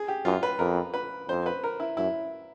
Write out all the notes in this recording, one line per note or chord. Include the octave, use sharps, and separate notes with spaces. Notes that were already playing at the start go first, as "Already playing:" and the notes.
Already playing: G#4
G4
F#2 F4
B4
F2 A#4
B4
F2 C5
B4
A#4
E4
F#2 E4